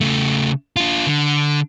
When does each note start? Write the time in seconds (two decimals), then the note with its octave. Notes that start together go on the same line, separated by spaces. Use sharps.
0.01 C#3 A3
0.76 D4 F4
1.06 D3